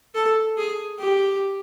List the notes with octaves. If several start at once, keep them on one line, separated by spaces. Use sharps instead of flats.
A4
G#4
G4